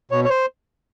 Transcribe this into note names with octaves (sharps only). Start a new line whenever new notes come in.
B2 C#5
C#5
C5